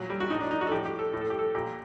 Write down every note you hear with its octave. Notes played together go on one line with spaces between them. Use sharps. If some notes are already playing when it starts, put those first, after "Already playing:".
Already playing: A#2 F#3
G3
F#4
A2 D#4
D4
D#4
F#4
A4
A2 G4
G4
A4
A2
A4
G4
A4
A#2 G4